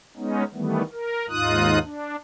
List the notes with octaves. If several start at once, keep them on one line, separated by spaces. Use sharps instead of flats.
G#3 B3 C#4 D#4
D#3 E3 G3 A3 B3
A#4
D#2 G#2 D#4 F4 D#6 F#6
D4